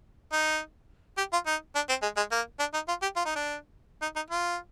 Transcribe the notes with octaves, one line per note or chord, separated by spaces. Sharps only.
D#4
G4
F4
D#4
D4
C4
G#3
G#3
A#3
D4
D#4
F4
G4
F4
D#4
D4
D#4
D#4
F4